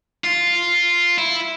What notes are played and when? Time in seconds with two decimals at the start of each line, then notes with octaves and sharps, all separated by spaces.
0.24 F4
1.18 E4